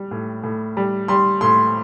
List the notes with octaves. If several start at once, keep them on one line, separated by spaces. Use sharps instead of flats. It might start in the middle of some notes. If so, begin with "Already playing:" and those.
Already playing: G3
A2
A2
G3
G3 C6
A2 C6